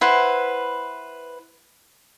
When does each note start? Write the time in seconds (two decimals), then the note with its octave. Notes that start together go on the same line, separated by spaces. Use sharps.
0.01 E4 B4 C5 F#5